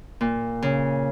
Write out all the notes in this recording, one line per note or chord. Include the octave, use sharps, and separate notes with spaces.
A#2
C#3